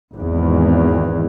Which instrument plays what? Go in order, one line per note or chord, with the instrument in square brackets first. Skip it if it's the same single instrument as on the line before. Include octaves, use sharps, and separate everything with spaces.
[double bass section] G#1 E2